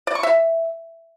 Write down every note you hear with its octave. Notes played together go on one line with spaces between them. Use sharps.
D5
C#6
E5